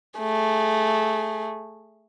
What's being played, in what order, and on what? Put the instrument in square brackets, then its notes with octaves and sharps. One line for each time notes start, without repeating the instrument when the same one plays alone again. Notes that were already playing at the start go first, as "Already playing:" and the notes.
[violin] A3 G#4